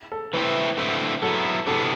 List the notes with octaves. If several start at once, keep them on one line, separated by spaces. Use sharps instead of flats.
A4
E3 A3 C4 E4 B4
D3 A3 C4 E4
F#3 B3 E4 A4
C3 E3 B3 D4 A4